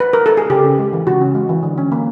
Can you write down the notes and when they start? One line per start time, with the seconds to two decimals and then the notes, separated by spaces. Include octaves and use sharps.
0.00 B4
0.13 A#4
0.26 A4
0.37 G#4
0.50 C#3 G4
0.64 C#4
0.79 G#3
0.93 E3
1.07 C#3 F#4
1.21 C#4
1.35 G#3
1.49 E3
1.63 D3
1.78 C#4
1.92 A#3